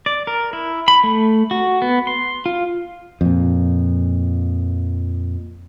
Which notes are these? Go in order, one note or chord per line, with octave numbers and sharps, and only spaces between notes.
D5
A#4
E4
B5
A3
F#4
B3
C6
F4
F2 A#2